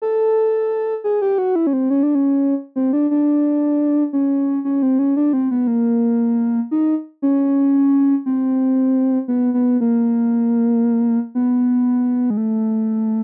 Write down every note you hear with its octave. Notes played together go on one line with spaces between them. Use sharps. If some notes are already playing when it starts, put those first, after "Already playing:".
A4
G#4
G4
F#4
E4
C#4
C4
C#4
D4
C#4
C4
D4
D4
C#4
C#4
C4
C#4
D4
C4
B3
A#3
D#4
C#4
C4
B3
B3
A#3
B3
G#3
A3